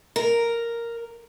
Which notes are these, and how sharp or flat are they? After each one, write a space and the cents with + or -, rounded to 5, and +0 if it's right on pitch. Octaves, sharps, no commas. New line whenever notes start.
A#4 +0